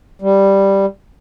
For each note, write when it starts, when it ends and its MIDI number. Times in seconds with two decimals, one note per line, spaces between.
0.22 0.86 55